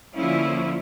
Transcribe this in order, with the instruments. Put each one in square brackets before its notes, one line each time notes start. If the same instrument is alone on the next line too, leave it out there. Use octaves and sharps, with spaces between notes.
[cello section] D3 F3 A#3 C#4 E4 F4